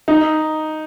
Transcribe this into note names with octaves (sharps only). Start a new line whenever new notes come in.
D#4